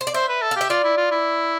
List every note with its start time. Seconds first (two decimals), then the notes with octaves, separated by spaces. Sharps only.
0.01 C5
0.07 D5
0.14 C5 E5
0.29 B4
0.42 A4
0.51 F5
0.56 G4 E5
0.70 F4 D5
0.84 E4
0.98 F4
1.12 E4